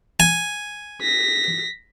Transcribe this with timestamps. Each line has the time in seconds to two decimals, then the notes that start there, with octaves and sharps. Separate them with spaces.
0.20 G#5
1.01 A#6 B6